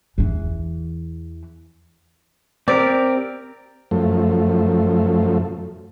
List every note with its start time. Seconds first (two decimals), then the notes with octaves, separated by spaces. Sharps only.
0.18 E2 E3
2.68 C4 G4 A#4 D5
3.91 F#2 F3 A3